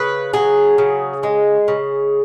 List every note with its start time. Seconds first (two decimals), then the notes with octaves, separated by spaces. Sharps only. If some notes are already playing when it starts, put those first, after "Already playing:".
Already playing: C#3 B4
0.33 F#3 G#4
0.78 C#3
1.23 G#3
1.68 C#3